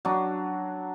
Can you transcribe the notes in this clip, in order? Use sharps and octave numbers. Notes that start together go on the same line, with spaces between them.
F#3 D4